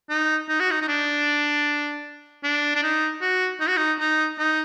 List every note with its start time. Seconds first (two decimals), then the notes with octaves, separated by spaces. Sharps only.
0.09 D#4
0.49 D#4
0.60 F#4
0.71 D#4
0.81 D#4
0.88 D4
2.44 D4
2.75 D4
2.83 D#4
3.21 F#4
3.60 D#4
3.68 F#4
3.77 D#4
3.99 D#4
4.38 D#4